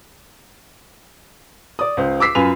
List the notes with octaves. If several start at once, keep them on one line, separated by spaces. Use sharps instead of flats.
D5 D#6
C#2 C5
D6 E6 B6 C7
F#2 F4 B4 G#5 F7